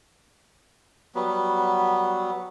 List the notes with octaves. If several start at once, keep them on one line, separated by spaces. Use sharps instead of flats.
F#3 G3 B3